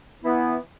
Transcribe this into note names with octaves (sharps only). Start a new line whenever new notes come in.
E3 B3 E4